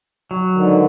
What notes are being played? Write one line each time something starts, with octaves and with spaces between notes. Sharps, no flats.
F#3
G#2 D3 D#3